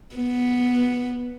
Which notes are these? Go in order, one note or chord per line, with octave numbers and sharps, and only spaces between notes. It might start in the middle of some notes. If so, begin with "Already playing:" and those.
B3